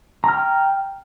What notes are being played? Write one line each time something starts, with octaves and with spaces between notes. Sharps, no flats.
G5 A#5 F6